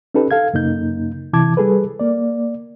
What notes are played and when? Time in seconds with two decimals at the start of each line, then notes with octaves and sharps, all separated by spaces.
0.15 C#4 D#4 G4 A4 B4
0.31 A4 F5 G#6
0.54 F#2 C#3 A#3 D#4 G6
1.33 C3 E3 E4 A5 D6 G#6
1.57 G3 G#4 A4 B4
1.99 A#3 D5